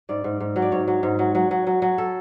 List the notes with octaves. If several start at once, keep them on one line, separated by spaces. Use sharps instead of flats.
G#2 D5
G#2
G#2
F#3
D5
G#2 C#5
F#3
G#2
F#3
F#3
F#3
F#3
F#3
A4